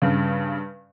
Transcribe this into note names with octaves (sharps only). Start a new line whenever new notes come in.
G2 C#3